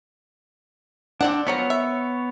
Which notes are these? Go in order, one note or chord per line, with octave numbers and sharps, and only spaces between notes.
C4 D4 D5 F#5
F3 F#3 B3 A#4 C#5
E5